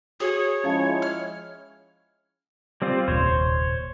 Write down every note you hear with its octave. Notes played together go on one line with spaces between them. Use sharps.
F#4 G#4 C#5 D#6
F3 G#3 C#4 E4 F5 A5
F6
G3 C4 F4
F1 D#2 A#2 C5 C#5